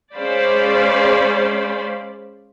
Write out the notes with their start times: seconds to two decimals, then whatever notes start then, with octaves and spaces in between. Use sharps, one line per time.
0.14 G#3 C#4 C5 D5 F5 B5